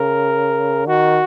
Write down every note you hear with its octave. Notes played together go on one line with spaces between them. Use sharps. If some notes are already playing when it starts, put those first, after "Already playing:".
Already playing: C#3 A#4
D#3 F#4